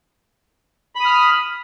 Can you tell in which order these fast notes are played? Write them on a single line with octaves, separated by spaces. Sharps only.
B5 D#6 F6